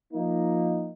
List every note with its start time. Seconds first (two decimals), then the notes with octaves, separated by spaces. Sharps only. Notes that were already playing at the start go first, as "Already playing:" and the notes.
0.13 F3 A#3 D#4